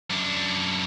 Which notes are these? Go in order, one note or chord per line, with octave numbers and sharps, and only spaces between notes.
F#2 D4